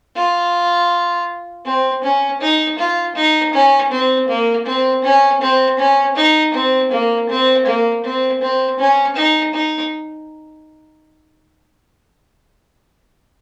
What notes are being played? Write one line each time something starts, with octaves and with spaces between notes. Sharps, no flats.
F4
C4
C#4
D#4
F4
D#4
C#4
C4
A#3
C4
C#4
C4
C#4
D#4
C4
A#3
C4
A#3
C4
C4
C#4
D#4
D#4